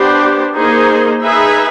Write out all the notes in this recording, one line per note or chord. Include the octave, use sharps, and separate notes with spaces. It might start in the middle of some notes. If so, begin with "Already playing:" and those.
Already playing: B3 D4 G4 C5
A#3 D#4 G#4 C5
D#4 G#4 B4 E5